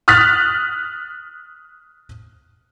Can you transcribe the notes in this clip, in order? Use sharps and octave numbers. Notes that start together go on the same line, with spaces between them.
D#6 F6 F#6 A6 B6